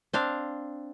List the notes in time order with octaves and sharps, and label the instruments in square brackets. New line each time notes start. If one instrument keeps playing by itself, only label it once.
[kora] C4 D4 F5